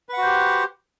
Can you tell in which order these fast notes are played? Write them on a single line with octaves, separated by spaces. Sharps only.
B4 F#5 F#4 C5 G4